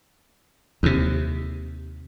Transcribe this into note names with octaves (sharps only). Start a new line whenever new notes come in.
D#2 C3